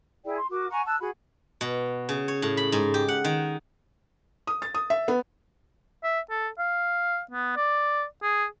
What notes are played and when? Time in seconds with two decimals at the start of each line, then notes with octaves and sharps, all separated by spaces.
0.24 E4 G#4 D5 G5
0.37 C6
0.50 F#4 A#4 D6
0.70 F#5 G#5 A#5 C#6
0.86 A5 E6 F#6
1.00 F#4 G#4 F#5 B5
1.61 B2
2.09 C#3
2.28 C#5
2.42 A2
2.57 B5
2.72 G#2
2.94 G4
3.08 F#5
3.24 D#3
4.47 D#6
4.62 A6
4.74 D#6
4.90 E5
5.08 B3
6.04 E5
6.30 A4
6.58 F5
7.31 B3
7.56 D5
8.22 G#4